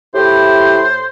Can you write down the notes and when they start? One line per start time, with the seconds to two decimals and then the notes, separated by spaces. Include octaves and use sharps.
0.15 A2 E4 G4 C5